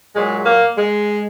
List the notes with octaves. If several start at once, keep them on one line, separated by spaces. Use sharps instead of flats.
A#2 F#3 G#3
A#3
G#3